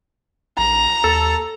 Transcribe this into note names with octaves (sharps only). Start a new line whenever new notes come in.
A#1 A#5
D#2 A4